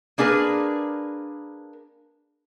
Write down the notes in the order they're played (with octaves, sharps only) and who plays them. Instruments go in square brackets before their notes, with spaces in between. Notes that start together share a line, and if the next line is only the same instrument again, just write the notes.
[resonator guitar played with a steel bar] A#3 D4 G#4 A#4 B4